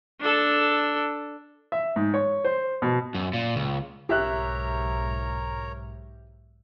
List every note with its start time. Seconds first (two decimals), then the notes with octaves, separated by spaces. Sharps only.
0.21 D4 A4
1.72 E5
1.96 G#2
2.14 C#5
2.45 C5
2.82 B2
3.14 F#2
3.33 A#2
3.56 C#2
4.09 B1 G#2 G4 A#4 C#5 E5 A#5 F#6